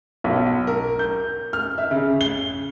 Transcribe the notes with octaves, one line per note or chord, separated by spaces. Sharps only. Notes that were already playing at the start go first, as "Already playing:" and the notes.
B1
A#4
G6
F6
E5
C#3
G7